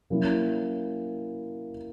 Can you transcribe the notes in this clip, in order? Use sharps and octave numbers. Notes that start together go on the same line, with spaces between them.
F#3 A#3 C#4 E4